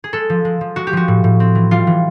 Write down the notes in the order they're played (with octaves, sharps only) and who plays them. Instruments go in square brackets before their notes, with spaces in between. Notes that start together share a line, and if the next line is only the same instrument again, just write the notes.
[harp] G#4
G#3 A4
F3
G#3
F3
G#3 F#4
G4
F3 F#4
A2
A2
C4
E3
G3 F4
E3